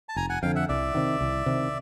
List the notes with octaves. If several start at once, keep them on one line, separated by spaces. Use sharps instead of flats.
A5
F1 G#5 A#5
F#5 G#5
F2 D3 F5 G5
E5 F#5
C2 D5 E5
C3 D#3
C2
C3 D#3